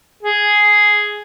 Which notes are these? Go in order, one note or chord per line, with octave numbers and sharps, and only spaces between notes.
G#4